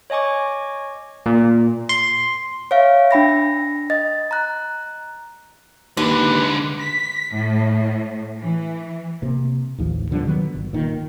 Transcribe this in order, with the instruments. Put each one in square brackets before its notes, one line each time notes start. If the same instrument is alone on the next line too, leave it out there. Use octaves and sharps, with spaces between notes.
[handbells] C#5 D#5 G#5 C#6 D6
[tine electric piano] A#2
C6
[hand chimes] C#5 E5 F5
D4 G5 B5 A#6
D#5 A6
A#5 F#6
[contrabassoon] D#2 [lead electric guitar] D3 G#3 [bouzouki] B4
[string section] B6
A2
E3
[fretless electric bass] C3 A#3
A1 D#2 F3
B2 D3 F3 G3
D#3 F#3 B3
G1
A#2 D#3